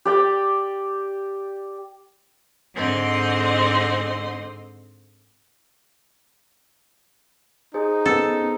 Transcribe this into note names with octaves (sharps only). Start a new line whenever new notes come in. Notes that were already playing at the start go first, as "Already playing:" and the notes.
G4 D5 G5
G#2 D3 C4 D#5 C6
D#4 G#4 C5
B3 C#4 A4